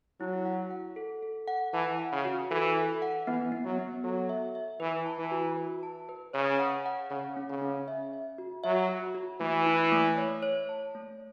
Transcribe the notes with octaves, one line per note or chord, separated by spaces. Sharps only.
F#3 E4
F#5
F#5
A4
A4
F#5
E3 A5
F#5
C#3
F#4
E3 A4
A4
F#5
E3 B3
B3
F#3
B3
F#3 A4
E5
E5
E3 B4
A5
E3
F#4
B4
A5
B4
C#3 C#5
F#5
F#5
C#3 C#5
C#4
C#3
C#4
E5
E5
F#4
F#3 E5
F#4
F#4
E3 A3
E4
A3
C#5
C#5
A5
A3